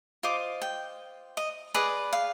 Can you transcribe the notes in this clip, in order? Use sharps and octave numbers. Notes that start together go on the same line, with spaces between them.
F4 C5 D#5 D6
G5
D#5
G#4 B4 D5 D#5
F5